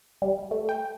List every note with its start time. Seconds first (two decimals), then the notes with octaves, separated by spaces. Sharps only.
0.22 G3
0.51 A3
0.69 G5